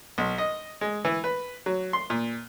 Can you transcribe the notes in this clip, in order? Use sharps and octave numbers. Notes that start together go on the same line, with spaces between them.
B1
D#5
G#3
E3
B4
F#3
C6
A#2